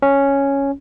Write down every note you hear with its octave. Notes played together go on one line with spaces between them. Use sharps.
C#4